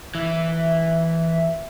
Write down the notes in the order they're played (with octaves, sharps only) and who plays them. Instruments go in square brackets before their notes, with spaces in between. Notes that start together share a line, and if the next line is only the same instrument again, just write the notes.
[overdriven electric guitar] E3 [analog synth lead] E5